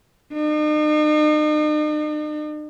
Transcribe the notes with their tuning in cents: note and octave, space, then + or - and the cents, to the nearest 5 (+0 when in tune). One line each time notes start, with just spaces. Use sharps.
D#4 -45